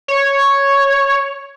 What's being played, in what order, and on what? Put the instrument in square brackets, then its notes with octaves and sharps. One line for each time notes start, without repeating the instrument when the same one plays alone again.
[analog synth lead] C#5